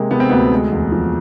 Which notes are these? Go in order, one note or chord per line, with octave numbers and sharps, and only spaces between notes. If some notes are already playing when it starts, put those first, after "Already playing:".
Already playing: C3 G#3 A#3
C3 B3
C4
D2 B3
G#3
E2
F3